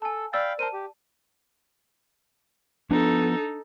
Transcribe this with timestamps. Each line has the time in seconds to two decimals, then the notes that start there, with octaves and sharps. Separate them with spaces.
0.02 A4 G#5 A5
0.33 D5 F5 G5 B5 E6 A6
0.59 A#4 C5 A5 D#7
0.73 G4
2.91 F3 B3 D4 D#4 A4